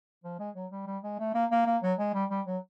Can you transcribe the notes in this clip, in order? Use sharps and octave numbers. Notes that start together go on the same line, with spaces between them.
F3
G#3
F#3
G3
G3
G#3
A3
A#3
A#3
A#3
F#3
G#3
G3
G3
F#3